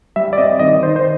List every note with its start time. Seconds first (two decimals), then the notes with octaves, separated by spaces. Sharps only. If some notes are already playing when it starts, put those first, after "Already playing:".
0.16 G3 E5
0.33 D5
0.38 C4 D#5
0.59 D#3 D#5
0.82 D#3 C5
0.96 C5